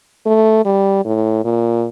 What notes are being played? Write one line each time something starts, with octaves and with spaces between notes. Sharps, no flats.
A3
G3
A2
A#2